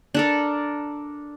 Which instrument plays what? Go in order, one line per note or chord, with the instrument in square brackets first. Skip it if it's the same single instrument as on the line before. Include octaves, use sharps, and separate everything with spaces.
[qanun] D4 A4 A#4